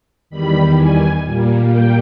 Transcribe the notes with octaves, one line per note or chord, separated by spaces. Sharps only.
E2 D#3 G3 B5
G#5
A#2 G3 A#3
G5